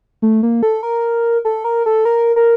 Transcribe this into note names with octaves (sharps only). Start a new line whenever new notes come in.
A3
A#3
A4
A#4
A4
A#4
A4
A#4
A#4